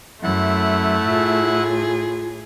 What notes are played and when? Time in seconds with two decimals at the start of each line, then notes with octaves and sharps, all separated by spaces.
0.23 F#2 A3 E4 F#5
1.07 A2 F4 G#4